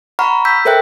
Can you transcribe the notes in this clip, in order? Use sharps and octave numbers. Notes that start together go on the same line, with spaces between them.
F#5 A#5 B5 C#6 F6
E6 G6 B6
A4 A#4 C5 E5 G5 F#6